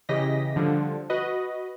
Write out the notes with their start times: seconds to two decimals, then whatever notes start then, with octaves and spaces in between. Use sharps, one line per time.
0.09 C#3 E3 G4 D#5 A#6 B6
0.56 D3 F3 G3
1.10 F#4 B4 D#5